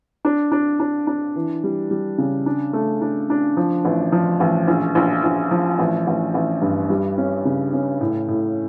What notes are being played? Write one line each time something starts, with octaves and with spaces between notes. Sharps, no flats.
D4
D4
D4
D4
E3
G3
G3
C#3
D4
A3
D4
D4
F3
A1
F3
A1
A#1
A#1
A#1
F3
A1
A1
A1
G2
G3
C#4
C#3
C#4
A2
A2